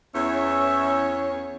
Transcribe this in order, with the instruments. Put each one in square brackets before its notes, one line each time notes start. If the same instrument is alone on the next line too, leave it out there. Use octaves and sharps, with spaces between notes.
[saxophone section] E2 C#5 [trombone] C#4 [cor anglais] E5